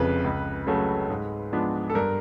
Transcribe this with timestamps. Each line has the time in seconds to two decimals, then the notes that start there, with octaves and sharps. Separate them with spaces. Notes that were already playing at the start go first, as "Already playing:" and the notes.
Already playing: F1 F2 C#3 F3 B4
0.24 C#2
0.67 C#3 F#3 A3 C#4
1.09 G#2
1.52 F3 G#3 B3 D4
1.90 A4
1.95 G2 A#4